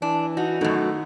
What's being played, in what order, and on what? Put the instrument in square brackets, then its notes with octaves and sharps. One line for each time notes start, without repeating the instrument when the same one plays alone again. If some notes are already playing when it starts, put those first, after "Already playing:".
[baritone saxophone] E3 [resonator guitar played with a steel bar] D4
[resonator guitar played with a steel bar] D#4 [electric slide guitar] F#4
[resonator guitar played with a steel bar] F#2 B2 [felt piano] D#3 D#4 [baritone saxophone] A3